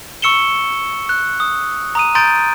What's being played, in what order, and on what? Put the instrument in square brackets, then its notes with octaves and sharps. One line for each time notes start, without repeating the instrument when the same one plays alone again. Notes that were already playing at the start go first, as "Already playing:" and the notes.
[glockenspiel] C#6 E6 C#7 E7 G7
F#6
D#6
A#5 D#6 D#7
A#5 C6 D#6 G6 A6 D7